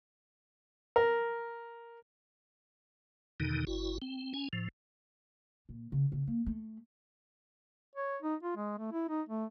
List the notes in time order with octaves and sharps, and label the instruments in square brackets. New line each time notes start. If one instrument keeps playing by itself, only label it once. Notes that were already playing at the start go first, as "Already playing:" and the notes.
[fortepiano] A#4
[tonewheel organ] E2 B2 D3 D#3 D#4
G1 E4 F#4
C4
C#4 G#5
A2 F3
[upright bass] A#2
C#3
C#3
A#3
A3
[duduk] C#5
D#4
F4
G#3
A3
E4
D#4
A3